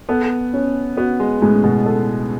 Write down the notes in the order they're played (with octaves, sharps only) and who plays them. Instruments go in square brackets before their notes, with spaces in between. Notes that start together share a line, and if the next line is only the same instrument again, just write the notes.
[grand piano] B3 [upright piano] A4
[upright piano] C#4
[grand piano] B3 [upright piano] F#4
[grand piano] G#3
[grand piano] A2 [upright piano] G#3
[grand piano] B2
[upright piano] A4